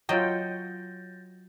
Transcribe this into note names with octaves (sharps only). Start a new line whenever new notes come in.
F#3 F4 C#5 D#5 G5 G6 A6 A#6